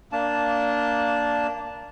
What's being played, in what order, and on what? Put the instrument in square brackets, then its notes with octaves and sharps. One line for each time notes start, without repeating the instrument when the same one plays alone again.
[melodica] A#3 D4 A5